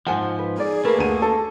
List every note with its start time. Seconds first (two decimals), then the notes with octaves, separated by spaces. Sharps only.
0.07 G#2 F3 F#5 G#5 A5
0.39 B4
0.58 D#4 G#4 D5
0.85 A3 A#3 A#4 B4
0.98 D2 D#7
1.22 A4